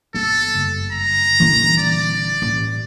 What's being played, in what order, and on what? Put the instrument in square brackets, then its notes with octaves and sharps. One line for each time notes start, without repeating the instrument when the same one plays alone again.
[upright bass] G1 [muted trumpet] A4
[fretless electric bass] F#1
[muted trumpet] A#5
[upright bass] D#1 D3 [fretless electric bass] E3
[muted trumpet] D5
[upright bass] A1